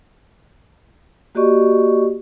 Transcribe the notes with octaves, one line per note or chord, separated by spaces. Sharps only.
A#3 F#4 G4 D5 D#5 C#6